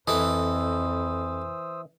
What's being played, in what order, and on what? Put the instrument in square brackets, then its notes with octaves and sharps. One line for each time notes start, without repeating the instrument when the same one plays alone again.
[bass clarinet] F2 [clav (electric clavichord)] E3 [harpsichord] A4 D#5 [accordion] C5 D#6 E6